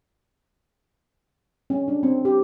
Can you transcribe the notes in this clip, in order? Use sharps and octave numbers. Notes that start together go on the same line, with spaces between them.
C#4
D4
C4
G4